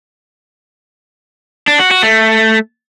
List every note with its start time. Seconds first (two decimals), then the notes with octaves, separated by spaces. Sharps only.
1.68 D4
1.79 F#4
1.91 F#4
2.03 A3